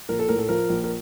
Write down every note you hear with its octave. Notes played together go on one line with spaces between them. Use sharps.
A#1 A#4
A4
A2 A#4
A4
F3 A#4
A#1
A#4